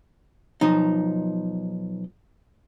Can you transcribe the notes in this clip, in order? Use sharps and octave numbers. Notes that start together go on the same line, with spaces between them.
B1 F3 D#4